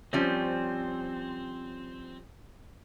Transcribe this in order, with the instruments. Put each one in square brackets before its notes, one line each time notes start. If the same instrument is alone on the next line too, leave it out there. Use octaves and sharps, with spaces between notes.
[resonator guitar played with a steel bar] F3 G3 C#4 [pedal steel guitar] C4